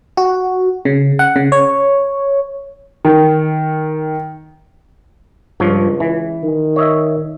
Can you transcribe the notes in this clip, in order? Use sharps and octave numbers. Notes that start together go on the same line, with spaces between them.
F#4
C#3
F#5
C#3
C#5
D#3
C#2 G2 F3 C#5
E3
D#3
C#5 D#5 E5